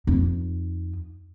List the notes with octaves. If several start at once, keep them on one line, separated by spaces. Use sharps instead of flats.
F2 D#4